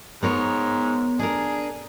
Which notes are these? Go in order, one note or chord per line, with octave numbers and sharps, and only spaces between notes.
G#2 B3 A#4 C#5
D4 G#4 A#4